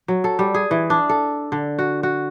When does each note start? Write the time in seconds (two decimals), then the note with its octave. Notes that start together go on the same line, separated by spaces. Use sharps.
0.08 F#3
0.24 A4
0.39 G3
0.55 G#4
0.71 E3
0.90 D4
1.09 A4
1.52 D3
1.79 F#4
2.03 F#4